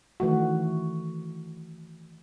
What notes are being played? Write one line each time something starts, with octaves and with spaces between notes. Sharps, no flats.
D#3 E3 A3 F#4